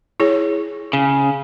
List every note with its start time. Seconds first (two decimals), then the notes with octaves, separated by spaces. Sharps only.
0.20 E4 G#4 C#5
0.93 C#3